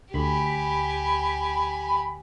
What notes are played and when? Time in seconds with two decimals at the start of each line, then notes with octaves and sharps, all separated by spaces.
0.14 D2 G4 G#5 B5